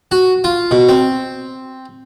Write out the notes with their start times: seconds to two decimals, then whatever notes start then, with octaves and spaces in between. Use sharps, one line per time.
0.12 F#4
0.44 F4
0.71 B2
0.89 C4